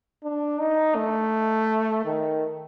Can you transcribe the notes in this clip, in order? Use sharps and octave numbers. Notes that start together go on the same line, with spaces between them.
D4
D#4
A3
D#3